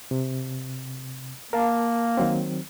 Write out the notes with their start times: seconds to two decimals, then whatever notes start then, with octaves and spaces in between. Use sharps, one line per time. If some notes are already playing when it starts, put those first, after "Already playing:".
0.11 C3
1.53 A#3 A#4 F5 A5
2.17 D#3 F#3 C4